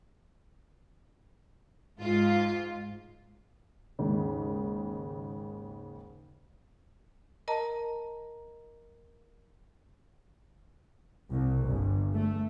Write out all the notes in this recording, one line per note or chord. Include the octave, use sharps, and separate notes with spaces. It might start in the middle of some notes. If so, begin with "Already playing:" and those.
G#2 F4
D#2 G#2 C#3
A#4 D#5 A5 A#5
C2
G1
A3